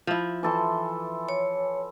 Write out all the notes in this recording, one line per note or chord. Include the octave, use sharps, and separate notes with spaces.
F3 E4
E3 A4 C6
C#5